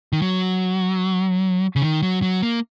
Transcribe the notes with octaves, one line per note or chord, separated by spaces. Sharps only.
D#3
F#3
C#3
D#3
F#3
F#3
A#3